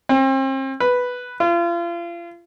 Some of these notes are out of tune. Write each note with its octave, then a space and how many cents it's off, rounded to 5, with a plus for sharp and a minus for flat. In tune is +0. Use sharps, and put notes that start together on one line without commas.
C4 +40
B4 +0
F4 -35